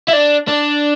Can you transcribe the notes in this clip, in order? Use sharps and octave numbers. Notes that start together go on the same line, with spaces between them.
E4
D4
D4